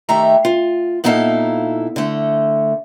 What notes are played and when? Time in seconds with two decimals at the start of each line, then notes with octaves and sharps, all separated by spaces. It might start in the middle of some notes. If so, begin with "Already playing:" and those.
0.09 D#3 G3 A3 E5 G5 A#5
0.45 F4
1.04 A#2 B3 D#4 E4 A4 F5
1.96 D3 A3